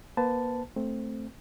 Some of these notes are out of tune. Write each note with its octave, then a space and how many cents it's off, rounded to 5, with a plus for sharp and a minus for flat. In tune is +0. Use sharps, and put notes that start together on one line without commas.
A#3 +40 B4 +35 A5 +0
A3 +0 C4 +0